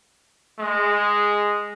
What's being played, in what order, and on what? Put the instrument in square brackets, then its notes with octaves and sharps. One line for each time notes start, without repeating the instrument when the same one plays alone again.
[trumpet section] G#3